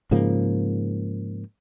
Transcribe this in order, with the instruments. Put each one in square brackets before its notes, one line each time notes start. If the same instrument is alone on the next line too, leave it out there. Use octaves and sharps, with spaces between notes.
[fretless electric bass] G#2 C#3 F3 A#3